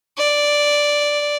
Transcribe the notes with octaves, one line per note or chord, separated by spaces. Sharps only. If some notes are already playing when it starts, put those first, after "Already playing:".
D5